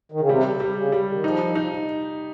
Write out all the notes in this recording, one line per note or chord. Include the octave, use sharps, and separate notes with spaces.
D#3
C#3
C3 G3
G3
C#3
G3
D#3
F3 D#4
D#4